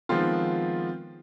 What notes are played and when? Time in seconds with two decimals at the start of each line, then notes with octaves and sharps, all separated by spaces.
0.09 D#3 F3 G#3 B3 C4 F4